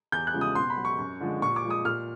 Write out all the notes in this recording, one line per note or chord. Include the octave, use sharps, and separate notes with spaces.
E2 G6
F#6
C#3 F3 G#3
D#6
B2 C6
B5
F#3
C#6
F#2
D3 F3 G#3
A#2 C#6
D6
F3 G#3
D#6
A#2 F6